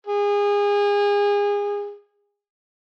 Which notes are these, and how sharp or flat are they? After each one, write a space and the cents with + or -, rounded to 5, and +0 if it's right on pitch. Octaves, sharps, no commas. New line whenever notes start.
G#4 -30